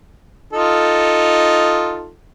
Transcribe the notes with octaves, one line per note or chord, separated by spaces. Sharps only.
D#4 F4 A4